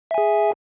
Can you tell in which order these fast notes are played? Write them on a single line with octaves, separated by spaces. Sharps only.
E5 G#5 G#4